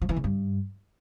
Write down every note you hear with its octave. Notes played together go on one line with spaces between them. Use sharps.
F3
E3
C#3
G2